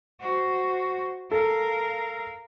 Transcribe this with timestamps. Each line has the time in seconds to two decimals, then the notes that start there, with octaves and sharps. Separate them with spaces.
0.20 F#4 C5
1.31 A4 A#4 F5